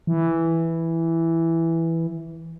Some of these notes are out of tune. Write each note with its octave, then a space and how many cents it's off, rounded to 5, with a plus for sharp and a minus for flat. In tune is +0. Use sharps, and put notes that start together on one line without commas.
E3 +0